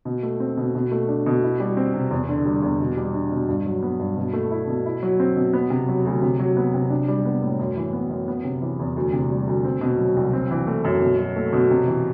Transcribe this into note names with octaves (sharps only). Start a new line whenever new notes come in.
B2
A3
C4
B2
B2
A3
D4
B2
E4
G3
C4
C3
E2
D3
G3
E2
B2
G3
D4
B2
G2
F#3
B3
G2
B2
A3
E4
B2
E4
F#3
C4
B2
B3
C3
F#3
D2
C3
F#3
B3
C3
D4
G3
B3
A2
F#2
E3
B3
F#2
B3
C3
E3
E2
D2
C3
G3
D2
C4
B2
F#3
C2
C4
E3
A3
F#2
B2
F#3
A3
B2
C3
E3